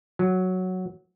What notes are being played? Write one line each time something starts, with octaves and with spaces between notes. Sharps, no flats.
F#3